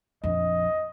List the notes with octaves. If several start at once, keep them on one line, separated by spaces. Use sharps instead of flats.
A#1 F2 D#5